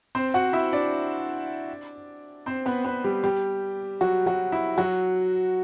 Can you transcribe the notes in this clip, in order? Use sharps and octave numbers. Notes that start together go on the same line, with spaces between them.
C4 C5
F#4 F#5
E4 E5
D4 D5
C4 C5
B3 B4
B3 B4
G3 G4
G3 G4
F#3 F#4
F#3 F#4
E4
F#3 F#4